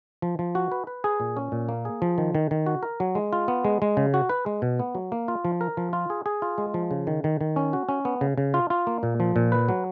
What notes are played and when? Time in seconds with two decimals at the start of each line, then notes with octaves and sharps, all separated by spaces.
0.22 F3
0.39 F3
0.55 F#4
0.72 B4
0.87 B4
1.04 G#4
1.20 A#2
1.37 C#4
1.52 A#2
1.69 A#3
1.85 G#4
2.02 F3
2.18 D#3
2.35 D#3
2.51 D#3
2.66 F#4
2.83 A#4
3.00 F#3
3.15 G#3
3.33 F4
3.48 B3
3.65 G#3
3.82 G#3
3.97 C#3
4.14 F#4
4.29 B4
4.46 G#3
4.62 B2
4.79 B3
4.95 F#3
5.12 A#3
5.28 F4
5.45 F3
5.61 A#4
5.77 F3
5.93 F4
6.10 G#4
6.26 G#4
6.42 F4
6.58 G#3
6.74 F3
6.91 C#3
7.07 D#3
7.24 D#3
7.41 D#3
7.56 C#4
7.73 F#4
7.89 C#4
8.05 B3
8.21 C#3
8.38 C#3
8.54 F4
8.70 F4
8.87 A#3
9.03 A#2
9.20 F3
9.36 A#2
9.52 B4
9.69 F#3